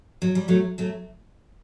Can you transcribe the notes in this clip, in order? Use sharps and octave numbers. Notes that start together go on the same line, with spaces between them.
F#3
G3
F#3 A3
F#3 A3